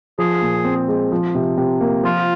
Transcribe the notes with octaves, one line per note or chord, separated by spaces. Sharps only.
F3 G#4
A#2
C4
G#3
F3
C3
C3
A#3
F3 F4